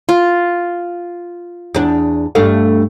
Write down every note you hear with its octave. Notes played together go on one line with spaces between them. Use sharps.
F4
E2 D4
G2 A3 F5